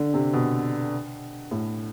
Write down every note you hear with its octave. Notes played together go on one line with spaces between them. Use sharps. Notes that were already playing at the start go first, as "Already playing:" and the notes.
Already playing: D3
C3
B2
A2